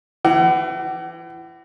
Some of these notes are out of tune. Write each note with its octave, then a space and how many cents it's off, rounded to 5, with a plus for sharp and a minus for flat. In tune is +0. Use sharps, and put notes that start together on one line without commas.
E3 +25 F#5 +40